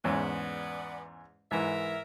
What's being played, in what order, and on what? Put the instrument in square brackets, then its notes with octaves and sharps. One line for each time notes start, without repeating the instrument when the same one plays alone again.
[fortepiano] E2 G#2 C#4 [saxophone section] B3 D5
[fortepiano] G#2 E3 [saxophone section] A#4 E5